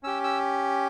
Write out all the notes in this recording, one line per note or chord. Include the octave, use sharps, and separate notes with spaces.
C#4 G4 E6
E6